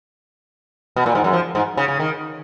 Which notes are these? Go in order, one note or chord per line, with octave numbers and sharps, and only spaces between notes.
B2
A#2
G#2
F#2
F3
G#2
C#3
C#3
D#3